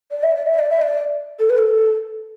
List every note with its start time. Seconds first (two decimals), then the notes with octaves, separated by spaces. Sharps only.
0.11 D5
0.23 E5
0.36 D5
0.47 E5
0.59 D5
0.70 E5
0.82 D5
1.39 A4
1.50 B4
1.58 A4